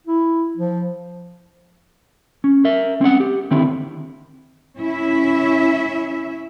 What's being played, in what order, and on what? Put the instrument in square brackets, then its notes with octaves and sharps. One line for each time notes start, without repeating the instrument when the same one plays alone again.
[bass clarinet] E4
F3
[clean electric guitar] C#4
A#4 E5
C4 C#4 E4 F#5
G4
D3 D#3 C4 E4
[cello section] C#4 E4 E5